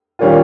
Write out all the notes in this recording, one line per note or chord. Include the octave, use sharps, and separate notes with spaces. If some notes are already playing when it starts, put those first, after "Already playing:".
A#2 D#3 G3 C#4 F4